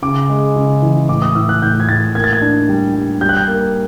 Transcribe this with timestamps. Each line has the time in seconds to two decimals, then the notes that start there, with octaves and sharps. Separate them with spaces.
0.02 C#3 D6
0.30 G#3
0.56 C#3
0.82 E3
1.09 A2 D6
1.22 D#6
1.35 A2 E6
1.49 F#6
1.62 A2 G6
1.80 G#6
1.88 A2 A6
2.15 A#3 G#6
2.24 A6
2.33 G#6
2.42 D4
2.69 G3
2.95 G3
3.21 G3 G6
3.29 F#6
3.37 G6
3.48 A#3